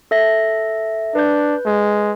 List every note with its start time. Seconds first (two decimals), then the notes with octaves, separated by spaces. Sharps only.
0.11 A4 E5 A#6
1.15 D4 B4 G6
1.66 G#3